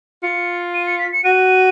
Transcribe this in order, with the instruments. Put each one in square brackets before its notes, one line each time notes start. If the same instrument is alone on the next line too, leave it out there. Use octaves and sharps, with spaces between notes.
[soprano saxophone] F4 [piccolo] C#7
[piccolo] D#7
C#7
B6
C#7
[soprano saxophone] F#4 [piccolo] D#7